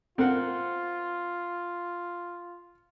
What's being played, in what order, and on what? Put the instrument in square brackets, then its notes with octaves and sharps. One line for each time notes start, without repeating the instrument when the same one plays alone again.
[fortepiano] C4 A#4 F#5 [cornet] F4